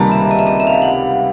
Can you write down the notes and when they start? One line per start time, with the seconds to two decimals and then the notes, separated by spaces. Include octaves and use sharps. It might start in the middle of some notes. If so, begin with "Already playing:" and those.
Already playing: C#2 C3 D#3 G3 A#3 A5 A#5
0.12 E5
0.31 D#5
0.39 E5
0.47 D#5
0.60 E5
0.67 F5
0.74 E5
0.82 F#5
0.88 F5